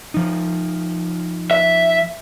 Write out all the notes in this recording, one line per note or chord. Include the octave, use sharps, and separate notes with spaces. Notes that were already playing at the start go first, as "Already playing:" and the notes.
F3 D#4
E5